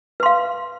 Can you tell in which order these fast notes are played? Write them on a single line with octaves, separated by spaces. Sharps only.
B4 C6 F5